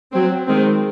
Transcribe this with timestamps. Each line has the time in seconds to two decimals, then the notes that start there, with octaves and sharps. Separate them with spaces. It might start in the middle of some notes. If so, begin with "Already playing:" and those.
0.12 F#3 C4
0.47 D#3 G#3 C4